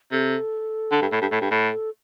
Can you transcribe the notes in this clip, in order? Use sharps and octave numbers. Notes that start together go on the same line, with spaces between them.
C3 A4
D3
G2
A2
G2
A2
G2
A2
A4